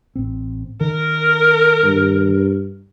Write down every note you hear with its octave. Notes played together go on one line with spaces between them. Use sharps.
A1 C4
D#3 A#4
G2